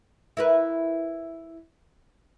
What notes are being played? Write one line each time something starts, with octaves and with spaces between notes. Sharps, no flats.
E4 A#4 B4